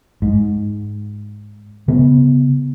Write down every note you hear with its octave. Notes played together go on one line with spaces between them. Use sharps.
G#2
C#3 B3